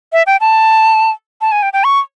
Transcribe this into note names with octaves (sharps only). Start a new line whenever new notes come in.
E5
G5
A5
A5
G#5
G5
G5
C#6